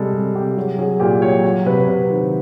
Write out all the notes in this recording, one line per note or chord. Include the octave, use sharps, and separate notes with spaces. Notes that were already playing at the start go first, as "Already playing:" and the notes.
Already playing: C3 G3 G#3 A4
C3
C3 G4
F#3 G#4
F#3 G#4
A#2 G4
F#3 C#5
F#3
C3 B4
C3 B4
D#3 C5